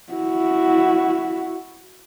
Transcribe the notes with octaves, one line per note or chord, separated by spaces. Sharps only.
E4 F#4